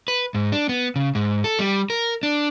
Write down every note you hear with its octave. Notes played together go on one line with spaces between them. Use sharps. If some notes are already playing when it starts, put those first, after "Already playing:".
B4
G#2
D4
B3
C#3
G#2
A4
G3
A#4
D4